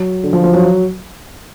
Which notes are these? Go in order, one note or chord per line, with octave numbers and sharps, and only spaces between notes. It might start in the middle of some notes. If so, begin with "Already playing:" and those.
Already playing: F#3
D3
F3
F3
F#3